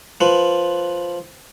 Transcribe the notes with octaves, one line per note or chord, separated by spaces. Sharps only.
F3 B4